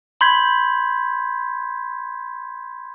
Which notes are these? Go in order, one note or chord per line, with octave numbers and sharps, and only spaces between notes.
B5 C6 G6 G#6 B6